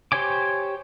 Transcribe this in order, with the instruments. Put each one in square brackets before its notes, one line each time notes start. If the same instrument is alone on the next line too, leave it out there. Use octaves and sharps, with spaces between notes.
[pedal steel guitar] G4 C5 C#5 G#5 D6